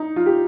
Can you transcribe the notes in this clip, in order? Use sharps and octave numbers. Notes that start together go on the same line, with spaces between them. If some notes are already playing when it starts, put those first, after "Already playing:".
Already playing: D#4
F4
G4